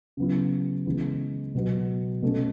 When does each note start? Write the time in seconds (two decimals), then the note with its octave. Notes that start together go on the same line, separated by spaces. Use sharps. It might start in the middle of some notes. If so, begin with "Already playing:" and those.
0.17 C#3 F#3 B3 E4
0.86 C#3 E3 G#3 B3 E4
1.55 B2 F#3 B3 F#4
2.22 B2 A3 C#4